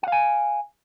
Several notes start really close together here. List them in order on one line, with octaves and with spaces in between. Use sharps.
F#5 F5 G#5